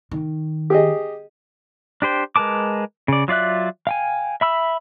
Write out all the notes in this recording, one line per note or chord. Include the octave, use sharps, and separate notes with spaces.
D#3
G4 G#4 D#5
D4 G4 C5 G5
G#3 A#4 B4 A5 D6
C#3 D5
F#3 F4 D5 E5 F#6
F5 G5 G#5
E5 B5 E6